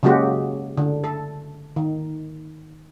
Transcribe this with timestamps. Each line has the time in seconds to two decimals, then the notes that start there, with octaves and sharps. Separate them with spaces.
0.03 C#3 F#3 G#3 A#3 F#4 G4
0.77 D3
1.04 A4
1.76 D#3